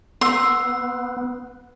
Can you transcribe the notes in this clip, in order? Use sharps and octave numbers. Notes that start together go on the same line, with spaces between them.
B3 F#5 C6 E6